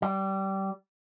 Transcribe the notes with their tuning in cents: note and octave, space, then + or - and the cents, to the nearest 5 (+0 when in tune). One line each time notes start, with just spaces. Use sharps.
G3 -20